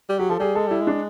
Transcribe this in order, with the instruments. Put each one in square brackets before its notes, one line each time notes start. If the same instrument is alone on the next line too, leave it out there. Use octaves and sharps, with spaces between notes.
[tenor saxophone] G3
[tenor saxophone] F#3 [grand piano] G4
[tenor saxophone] F3 [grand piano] A4
[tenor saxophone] G3 [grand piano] G#4
[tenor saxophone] G#3 [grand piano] A4
[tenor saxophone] G3 [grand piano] E4
[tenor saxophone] G#3
[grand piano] D4